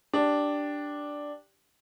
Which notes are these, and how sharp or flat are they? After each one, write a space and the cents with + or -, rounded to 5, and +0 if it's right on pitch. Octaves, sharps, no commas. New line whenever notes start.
D4 +0 G4 +0